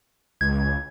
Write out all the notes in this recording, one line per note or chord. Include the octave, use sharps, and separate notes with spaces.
C#2 G#6